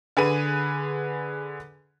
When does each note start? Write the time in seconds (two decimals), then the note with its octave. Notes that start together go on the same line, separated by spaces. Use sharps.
0.17 D3 G#4 B4 D#7